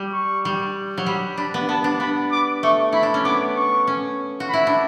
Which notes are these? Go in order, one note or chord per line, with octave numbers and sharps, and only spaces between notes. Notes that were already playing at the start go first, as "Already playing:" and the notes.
Already playing: G3
C#6
G3
F#3
G3 B5
D4 B5
B3
B3 A5
D4
B3 B5
D6
A3 C#6
E4 B5
D4
C#4
B3 D6
C#6
C#4
F#4
E4 B5
D4